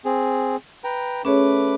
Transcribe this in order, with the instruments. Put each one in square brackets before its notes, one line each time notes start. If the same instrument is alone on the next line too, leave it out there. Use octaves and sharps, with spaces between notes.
[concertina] C4 G#4
B4 G5 A#5
[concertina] A3 B4 D6 [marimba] C#4 G#4 C#5